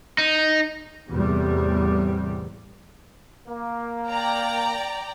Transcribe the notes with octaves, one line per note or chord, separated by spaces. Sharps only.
D#4
E2 A2 C3 G3
A#3
D5 G5 A#5